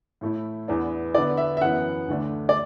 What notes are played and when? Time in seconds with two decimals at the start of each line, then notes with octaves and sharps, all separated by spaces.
0.21 A2 A3 E4
0.68 E2 E3 B3 D4
1.15 D3 B3 E4 D5
1.37 E5
1.57 E5
1.61 F#2 E3 B3 F#5
2.08 D2 D3 A3 D4
2.49 D5